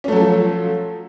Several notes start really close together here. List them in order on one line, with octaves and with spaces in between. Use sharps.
C#4 A3 F#3 A4 F3